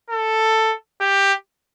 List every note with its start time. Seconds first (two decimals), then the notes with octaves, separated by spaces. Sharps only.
0.10 A4
1.01 G4